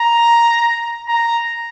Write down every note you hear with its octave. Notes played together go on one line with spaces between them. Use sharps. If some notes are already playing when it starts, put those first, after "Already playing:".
Already playing: A#5
A#5